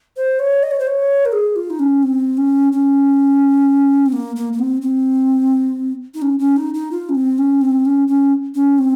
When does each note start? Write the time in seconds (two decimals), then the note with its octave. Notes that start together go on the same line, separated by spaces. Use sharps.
0.16 C5
0.39 C#5
0.63 D#5
0.71 C#5
0.79 C5
0.87 C#5
1.25 A#4
1.32 G#4
1.56 F4
1.70 D#4
1.79 C#4
2.03 C4
2.37 C#4
2.72 C#4
4.06 C4
4.12 A#3
4.36 A#3
4.53 A#3
4.59 C4
4.82 C4
6.14 D#4
6.22 C#4
6.39 C#4
6.56 D#4
6.74 D#4
6.91 F4
7.09 C#4
7.15 C4
7.38 C#4
7.61 C4
7.85 C#4
8.08 C#4
8.55 C#4
8.78 C4